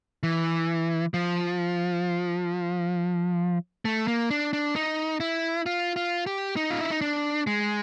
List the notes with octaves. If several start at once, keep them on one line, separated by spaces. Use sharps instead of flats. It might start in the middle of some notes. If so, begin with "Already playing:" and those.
E3
F3
A3
A#3
D4
D4
D#4
E4
F4
F4
G4
D#4
F4
E4
D#4
D4
G#3